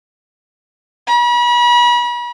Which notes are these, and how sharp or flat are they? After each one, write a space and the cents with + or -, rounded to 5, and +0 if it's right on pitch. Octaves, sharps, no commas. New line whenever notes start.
B5 -40